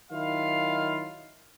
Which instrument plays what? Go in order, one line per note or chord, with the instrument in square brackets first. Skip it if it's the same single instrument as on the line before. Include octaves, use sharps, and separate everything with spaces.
[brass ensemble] D#3 F#3 E4 F4 F5